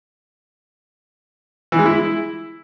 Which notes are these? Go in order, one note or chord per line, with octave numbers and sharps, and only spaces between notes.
E3
G#3
E4